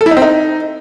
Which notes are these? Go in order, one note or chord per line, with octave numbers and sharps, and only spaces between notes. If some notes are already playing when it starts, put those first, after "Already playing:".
A4
E4
D#4
C4
D#4